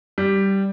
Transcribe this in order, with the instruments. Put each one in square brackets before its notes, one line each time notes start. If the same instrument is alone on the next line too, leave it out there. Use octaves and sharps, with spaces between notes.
[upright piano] G3